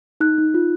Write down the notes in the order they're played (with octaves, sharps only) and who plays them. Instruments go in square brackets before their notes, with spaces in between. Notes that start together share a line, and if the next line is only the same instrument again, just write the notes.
[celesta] D#4 F#6
D#4
F4